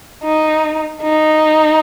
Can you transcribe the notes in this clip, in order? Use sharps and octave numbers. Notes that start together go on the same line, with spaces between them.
D#4
D#4